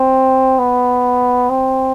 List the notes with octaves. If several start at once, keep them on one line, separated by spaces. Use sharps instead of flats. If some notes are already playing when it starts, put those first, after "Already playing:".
Already playing: C4
B3
C4